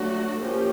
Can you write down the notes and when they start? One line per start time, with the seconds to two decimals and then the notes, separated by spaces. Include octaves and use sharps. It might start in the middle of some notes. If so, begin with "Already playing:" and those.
Already playing: F#3 A3 D4 F#4
0.41 F3 A#3 C#4 G4